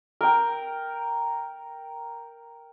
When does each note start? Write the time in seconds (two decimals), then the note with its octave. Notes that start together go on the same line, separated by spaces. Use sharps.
0.21 A#4 G5